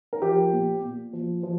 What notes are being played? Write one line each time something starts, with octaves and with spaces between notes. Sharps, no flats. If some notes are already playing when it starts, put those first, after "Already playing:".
A#4
F3 G4
A#2
A#2
F3
F3